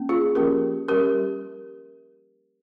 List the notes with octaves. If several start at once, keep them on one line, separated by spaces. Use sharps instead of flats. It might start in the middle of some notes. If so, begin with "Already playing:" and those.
Already playing: A#3 C#4
F4 G#4
F3 A#3 C#4 G4 A#4
G3 C#4 G4 A#4